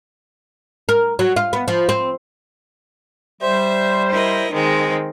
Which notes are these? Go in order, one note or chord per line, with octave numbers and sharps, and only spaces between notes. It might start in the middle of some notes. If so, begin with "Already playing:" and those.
A#4
F#3
F4
B3
F3
C4
G3 C5 E5
E4 A#4 D#5
D#3 G#3 C4